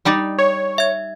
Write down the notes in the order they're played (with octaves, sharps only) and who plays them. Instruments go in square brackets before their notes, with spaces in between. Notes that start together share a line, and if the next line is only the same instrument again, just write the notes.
[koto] G3 D#4 D5
[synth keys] C#5
[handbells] E5 G#6